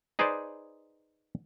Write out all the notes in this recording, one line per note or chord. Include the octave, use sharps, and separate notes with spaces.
D#4 G#4 B4 C5 D5